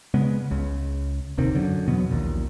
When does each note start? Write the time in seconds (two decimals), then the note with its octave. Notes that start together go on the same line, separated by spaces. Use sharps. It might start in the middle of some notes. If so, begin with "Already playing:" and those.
0.14 C#3 G#3 B3
0.51 C#2 C#3
1.37 G1 D#2 C3 D#3
1.55 F#2 D3
1.88 E2 B2 F#3 B3
2.11 A#1 D#2 A#2